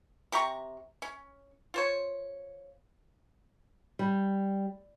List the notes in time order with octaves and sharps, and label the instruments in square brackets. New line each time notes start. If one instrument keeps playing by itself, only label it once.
[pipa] C3 G4 A#5 C#6
C#4
F4 C5 C#5
[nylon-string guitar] G3